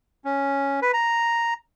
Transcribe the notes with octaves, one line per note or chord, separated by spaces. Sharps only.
C#4
B4
A#5